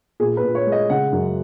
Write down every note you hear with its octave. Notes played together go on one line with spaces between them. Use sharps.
A#2 G#4
B4
A#2
C#5
G#3
D#5
C#3 F#5
F#2